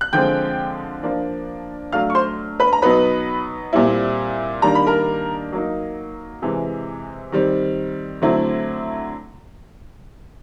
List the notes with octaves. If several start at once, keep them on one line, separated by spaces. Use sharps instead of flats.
F#6
D3 F3 G#3 C4 G5 G6
F3 A#3 D4
F#3 A3 D4 F5 F6
C#6
C5 C6
B4 B5
A#5
B2 F#3 B3 D#4 B4 B5
A#2 G3 C4 E4
D#3 G3 A#3 D4 A#5
B5
A#4 A#5
F#3 A#3 D#4
C3 E3 G#3
D#3 G3 C4
D3 F#3 A3 C4 E4